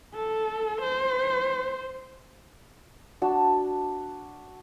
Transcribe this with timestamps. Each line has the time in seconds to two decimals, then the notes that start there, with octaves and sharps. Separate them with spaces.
0.14 A4
0.81 C5
3.22 D4 F#4 A5